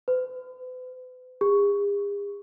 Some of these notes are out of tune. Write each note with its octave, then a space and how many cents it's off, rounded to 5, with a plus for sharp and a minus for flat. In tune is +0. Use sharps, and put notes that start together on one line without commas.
B4 +45
G#4 -45